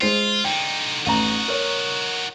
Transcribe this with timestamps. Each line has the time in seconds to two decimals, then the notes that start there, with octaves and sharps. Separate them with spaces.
0.01 G#3 F4 C5 C7
0.44 D3 D#4 G5
1.06 A1 D#4 F#4 A#5
1.48 A#4 C#5